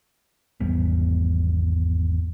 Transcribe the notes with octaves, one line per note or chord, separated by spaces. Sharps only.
G#1 E2 G3 B3